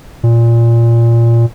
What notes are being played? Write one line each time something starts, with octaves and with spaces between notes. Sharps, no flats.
A#2